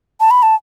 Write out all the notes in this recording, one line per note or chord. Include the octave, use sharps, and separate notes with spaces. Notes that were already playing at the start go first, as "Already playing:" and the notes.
A5
B5
A5